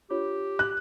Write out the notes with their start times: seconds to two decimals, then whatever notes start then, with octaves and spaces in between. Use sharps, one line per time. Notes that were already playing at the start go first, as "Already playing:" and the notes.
0.10 D4 F4 G4 C#5
0.59 F#6